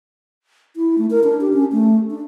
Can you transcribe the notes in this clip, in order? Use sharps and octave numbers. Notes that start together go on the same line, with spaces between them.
E4
A3
A#4
D4
G4
C#4
A3
D4